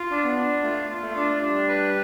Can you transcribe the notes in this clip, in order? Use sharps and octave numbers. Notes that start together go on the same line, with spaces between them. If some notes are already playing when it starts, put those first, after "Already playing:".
Already playing: F4
D4
B3
D4
A3 F4
F4
A3
D4
G3 D4
B4